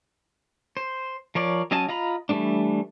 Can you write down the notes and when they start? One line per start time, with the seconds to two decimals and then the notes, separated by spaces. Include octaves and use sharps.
0.77 C5
1.35 F3 A#4 C#5 D5
1.71 F#3 C#4 D#5 G#5 A5
1.89 F4 D#5 A#5 B5
2.29 E3 G3 A3 A#3 D4